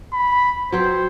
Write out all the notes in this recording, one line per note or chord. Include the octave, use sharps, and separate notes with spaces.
B5
F#3 C4 C5